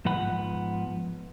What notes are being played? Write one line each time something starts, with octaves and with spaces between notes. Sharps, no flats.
G#2 F3 B3 F#5 B5